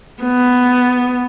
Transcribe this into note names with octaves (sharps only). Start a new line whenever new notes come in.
B3